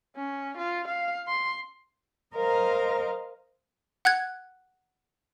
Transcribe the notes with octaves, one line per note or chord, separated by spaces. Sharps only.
C#4
F4
F5
C6
A#4 C5 D#5 F5 A#5
F#5 F#6 G#6